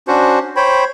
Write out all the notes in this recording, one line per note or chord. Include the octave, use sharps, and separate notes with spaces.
C#4 D4 F#4 C5
C5 C#5 G5 B5